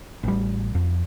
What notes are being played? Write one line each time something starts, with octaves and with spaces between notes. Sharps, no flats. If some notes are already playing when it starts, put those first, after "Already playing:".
A1 G3
F2